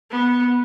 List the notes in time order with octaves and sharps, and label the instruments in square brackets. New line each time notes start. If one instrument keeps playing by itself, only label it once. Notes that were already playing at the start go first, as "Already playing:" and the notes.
[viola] B3